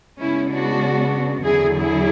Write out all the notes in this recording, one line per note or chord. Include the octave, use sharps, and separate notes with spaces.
C#3 G#3 B3 C#4 E4
D4 F#4
E2 D3 F#3 E4 G#4
E4 G#4